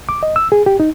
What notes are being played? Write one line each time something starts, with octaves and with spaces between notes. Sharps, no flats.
D6
D#5
E6
G#4
G4
D#4